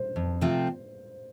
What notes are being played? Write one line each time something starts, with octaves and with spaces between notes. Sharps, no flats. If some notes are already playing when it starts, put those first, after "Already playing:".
Already playing: C5
F2
C3 F3 A3 C4